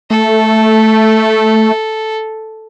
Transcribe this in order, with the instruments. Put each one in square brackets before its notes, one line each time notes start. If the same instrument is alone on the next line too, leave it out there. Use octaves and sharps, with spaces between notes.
[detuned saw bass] A3 [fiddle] A4